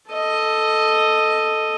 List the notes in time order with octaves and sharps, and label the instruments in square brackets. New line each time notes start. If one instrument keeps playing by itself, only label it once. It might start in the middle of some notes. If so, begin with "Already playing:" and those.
[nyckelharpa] A4 D#5